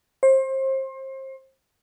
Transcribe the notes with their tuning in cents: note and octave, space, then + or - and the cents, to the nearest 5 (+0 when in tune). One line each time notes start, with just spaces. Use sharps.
C5 +30